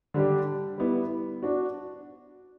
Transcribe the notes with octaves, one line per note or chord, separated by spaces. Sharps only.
D3 G3 D4 G4
G3 B3 E4
D4 F#4